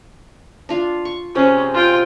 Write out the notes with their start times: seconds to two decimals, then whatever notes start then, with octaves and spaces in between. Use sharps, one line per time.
0.69 D4 F4 F5
1.05 C#6
1.35 C3 G#3 C4 C#4
1.74 F4 G5